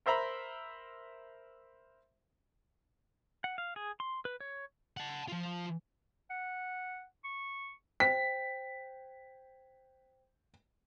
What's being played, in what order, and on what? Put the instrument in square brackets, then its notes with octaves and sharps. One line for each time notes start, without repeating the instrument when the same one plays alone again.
[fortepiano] A#4 C5 E5 A#5 B5
[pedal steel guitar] F#5
F5
G#4
C6
B4
C#5
[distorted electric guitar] F#5 A5
F3 F4
[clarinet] F#5
C#6
[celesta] C5 G5 [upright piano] B6